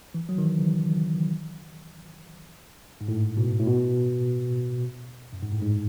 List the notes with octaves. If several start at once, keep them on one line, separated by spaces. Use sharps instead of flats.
E3
F#3
D#3
E3
C#3
G#2
A2
B2
A2
B2
F#2
G#2
A2
G#2